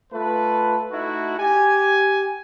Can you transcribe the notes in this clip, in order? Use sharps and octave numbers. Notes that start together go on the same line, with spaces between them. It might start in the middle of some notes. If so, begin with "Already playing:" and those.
A3 F4 B4
A3 D#4 E4 F#4
G4 G#5